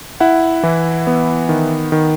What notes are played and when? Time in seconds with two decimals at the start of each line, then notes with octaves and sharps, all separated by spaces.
0.20 E4 F#5
0.63 E3
1.07 B3
1.49 D#3
1.92 D#3